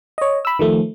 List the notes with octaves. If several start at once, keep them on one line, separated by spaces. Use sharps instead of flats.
C#5 D#5
B5 E6
D#3 F3 A3